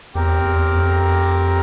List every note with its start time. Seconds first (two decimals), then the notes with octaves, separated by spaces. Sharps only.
0.15 E2 C4 G4 A#4
0.45 E2
0.75 F2